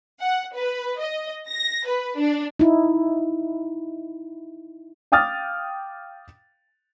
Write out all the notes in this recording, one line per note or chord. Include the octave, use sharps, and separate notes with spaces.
F#5
B4
D#5
A#6
B4
D4
D#4 E4
F5 G5 D6 D#6 F6 A6